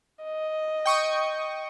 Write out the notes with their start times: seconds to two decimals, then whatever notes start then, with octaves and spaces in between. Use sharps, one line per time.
0.23 D#5
0.85 G5 C#6 D#6